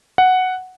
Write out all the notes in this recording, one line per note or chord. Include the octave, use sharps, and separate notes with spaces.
F#5